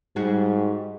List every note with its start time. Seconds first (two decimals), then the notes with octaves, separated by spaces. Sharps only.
0.16 G#2 G3 F#4 G#4